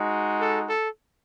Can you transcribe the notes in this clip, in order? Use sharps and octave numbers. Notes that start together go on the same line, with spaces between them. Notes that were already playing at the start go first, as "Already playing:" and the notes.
Already playing: G#3 D#4 F#4
A4
A4